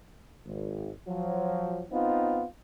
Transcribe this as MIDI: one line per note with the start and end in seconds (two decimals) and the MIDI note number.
0.46 0.91 32
1.07 1.84 53
1.07 1.84 54
1.92 2.44 59
1.92 2.44 60
1.92 2.44 63
1.92 2.44 65